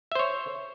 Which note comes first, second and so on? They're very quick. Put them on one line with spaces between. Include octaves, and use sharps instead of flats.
E5 C5 C#5